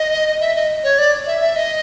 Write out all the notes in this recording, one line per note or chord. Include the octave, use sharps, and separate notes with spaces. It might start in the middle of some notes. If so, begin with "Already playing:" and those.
Already playing: D#5
E5
D#5
C#5
D5
E5
E5
D#5